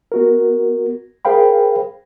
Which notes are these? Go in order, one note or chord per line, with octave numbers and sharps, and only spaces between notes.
B3 F#4 A#4
G#4 A#4 C5 F5 G5 B5